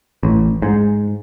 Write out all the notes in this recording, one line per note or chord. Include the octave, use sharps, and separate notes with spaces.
A1
G#2